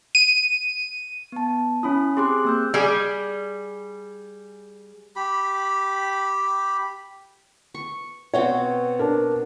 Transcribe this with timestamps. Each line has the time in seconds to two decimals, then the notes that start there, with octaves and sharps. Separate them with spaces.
0.15 D#7
1.32 B3 A5
1.83 C#4 E4 B5 D#6
2.17 C4 G4 G#4 C6 D6 F#6
2.45 A#3 C4 E6 G6
2.74 G3 G#4
5.16 G4 B5
7.75 C#6
8.34 B2 C4 F#4 C#5
8.99 D4 A#4